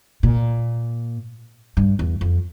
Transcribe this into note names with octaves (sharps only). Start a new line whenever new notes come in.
A#2
G2
E2
F2